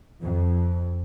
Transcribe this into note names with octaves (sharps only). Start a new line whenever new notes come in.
F2